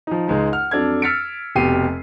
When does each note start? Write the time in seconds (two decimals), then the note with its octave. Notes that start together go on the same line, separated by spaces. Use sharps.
0.07 F3 D#4
0.28 C#2 G#3 D#4
0.52 F#5 F6
0.71 F2 F#3 D4 A4 G#6
1.02 E6 F6 A6 B6 C#7 D7
1.56 F1 B2 G4 C7 D#7